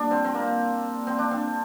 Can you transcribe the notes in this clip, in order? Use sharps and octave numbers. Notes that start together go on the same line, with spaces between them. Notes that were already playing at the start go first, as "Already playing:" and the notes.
Already playing: A#2 G3 D4
C4
C4
A#3
C4
D4
C4